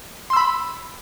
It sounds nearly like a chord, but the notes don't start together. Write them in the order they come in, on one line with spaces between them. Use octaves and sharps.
C6 E6 B5